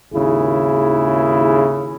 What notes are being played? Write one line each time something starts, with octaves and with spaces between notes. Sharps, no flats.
G#1 D#2 C#3 E4 G#4